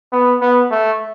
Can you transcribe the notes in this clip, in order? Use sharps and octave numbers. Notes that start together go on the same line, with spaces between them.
B3
B3
A3